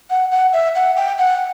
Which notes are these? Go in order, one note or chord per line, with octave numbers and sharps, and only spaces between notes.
F#5
F#5
E5
F#5
G5
F#5